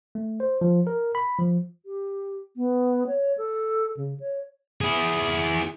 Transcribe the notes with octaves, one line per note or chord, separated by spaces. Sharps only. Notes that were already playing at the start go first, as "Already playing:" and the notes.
A3
C5
F3
A#4
B5
F3
G4
B3
C#5
A4
C#3
C#5
E4 G#4